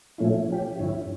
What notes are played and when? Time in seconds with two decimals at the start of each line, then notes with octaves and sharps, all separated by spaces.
0.18 A#2 F3 A3 C#4 E4
0.48 F3 C#4 G4
0.79 G2 D3 F3 C#4 E4